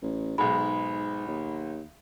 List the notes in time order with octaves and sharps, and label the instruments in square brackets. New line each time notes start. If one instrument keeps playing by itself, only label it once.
[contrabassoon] A1
[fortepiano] B1 G#3 [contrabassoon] G#2 [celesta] B5
[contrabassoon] D#2